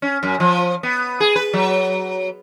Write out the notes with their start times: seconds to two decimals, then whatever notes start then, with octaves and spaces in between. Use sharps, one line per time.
0.02 C#4
0.23 F#2
0.40 F3
0.83 B3
1.20 G#4
1.36 B4
1.53 F#3